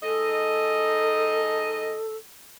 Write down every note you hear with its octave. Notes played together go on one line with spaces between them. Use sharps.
G#2 A4 D#5